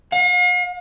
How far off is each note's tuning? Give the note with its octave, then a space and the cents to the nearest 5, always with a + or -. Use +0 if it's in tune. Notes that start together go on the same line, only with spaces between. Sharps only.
F5 +45